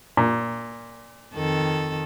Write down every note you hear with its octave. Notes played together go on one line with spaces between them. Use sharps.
A#2
F2 D#3 A4